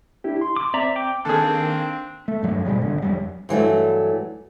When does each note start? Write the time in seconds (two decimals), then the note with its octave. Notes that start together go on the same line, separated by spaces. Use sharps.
0.24 D4 E4 G4
0.41 C6
0.56 D6
0.74 C4 D5 E5 A#5
0.96 G5 D6
1.25 D#3 A#3 C4 D4 G#4 A4
2.28 A3
2.43 G2 F#3 A3
2.65 G#2 B2 G3 G#3
2.82 G#1 D3
3.02 F2 F#3 G3
3.49 G2 E3 F#3 A3